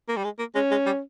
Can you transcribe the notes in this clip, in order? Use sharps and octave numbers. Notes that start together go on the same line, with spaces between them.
A#3
G3
G#3
A#3
G#3 C#4
G#3
G3